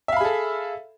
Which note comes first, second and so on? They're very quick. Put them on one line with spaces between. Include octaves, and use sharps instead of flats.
E5 F5 B5 G#4 A4